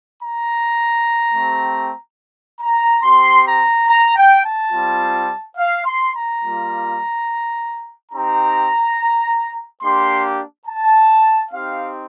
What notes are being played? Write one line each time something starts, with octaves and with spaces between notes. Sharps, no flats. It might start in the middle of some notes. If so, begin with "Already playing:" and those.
A#5
A3 C4 G4
A#5
C4 G4 C6
A#5
A#5
G5
A5
G3 C4 F4
F5
C6
A#5
G3 A#3 F4
C4 D#4 G4 A#5
A#3 D4 G4 C6
A5
C4 D#4 G4 F5